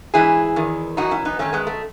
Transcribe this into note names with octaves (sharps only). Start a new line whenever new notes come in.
G#2 E3 E4 G#4
E2 D#3
F#2 E3 D#4 F#4
C#4 E4
B3 D#4
F#2 D#3 A3 C#4
G#3 B3
A3